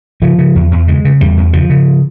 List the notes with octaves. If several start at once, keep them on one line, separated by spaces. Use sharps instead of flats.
C#3 F3
C#3
E2
E2
C#3 G#3
C#3
E2 G3
E2
C#3 F3
C#3